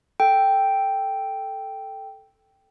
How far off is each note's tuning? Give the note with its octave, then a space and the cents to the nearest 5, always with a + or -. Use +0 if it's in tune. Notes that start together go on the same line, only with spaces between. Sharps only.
A4 +0 G5 +0